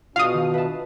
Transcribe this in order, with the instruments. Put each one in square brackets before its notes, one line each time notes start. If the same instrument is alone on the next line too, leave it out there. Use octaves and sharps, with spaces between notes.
[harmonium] B2 D4 [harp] F4 F#4 G#4 [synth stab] F5 D#6
[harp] D#3
B4 E5 A5